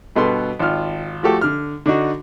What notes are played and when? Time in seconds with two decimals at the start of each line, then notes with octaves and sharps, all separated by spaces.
0.16 G2 B2 B3 A4 C6
0.59 G#1 F4 F6
1.23 F3 A3 F#4 G4 A4
1.41 D3 F6
1.86 D3 D4 D#4 F#4